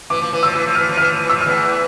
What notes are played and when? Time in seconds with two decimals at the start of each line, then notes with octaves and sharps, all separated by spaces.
0.10 E3 D6
0.22 F3
0.33 E3
0.43 F3 E6
0.55 E3
0.66 F3
0.75 E3 F6
0.89 F3
0.97 E3 F6
1.12 F3
1.24 E3
1.30 F3 E6
1.41 F6
1.46 E2 E3